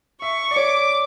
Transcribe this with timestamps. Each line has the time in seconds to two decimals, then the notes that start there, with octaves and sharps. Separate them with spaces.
0.22 E5 C#6
0.51 D5
0.56 C#5 D6